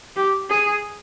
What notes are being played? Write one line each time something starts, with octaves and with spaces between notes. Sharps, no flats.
G4
G#4